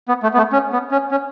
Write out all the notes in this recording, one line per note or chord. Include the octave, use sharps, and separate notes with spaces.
B3
A3
B3
A3
C#4
B3
C#4
C#4